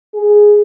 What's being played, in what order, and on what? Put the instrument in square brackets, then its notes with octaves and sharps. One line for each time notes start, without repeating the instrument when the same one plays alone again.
[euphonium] G#4